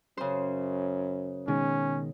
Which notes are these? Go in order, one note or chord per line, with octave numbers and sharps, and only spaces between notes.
F#2 C#3 C5
B2 D#3 G#3 C#4